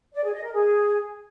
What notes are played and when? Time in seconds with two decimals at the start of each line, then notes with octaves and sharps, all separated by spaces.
0.13 D5
0.23 G#4
0.33 D#5
0.44 A#4
0.54 G#4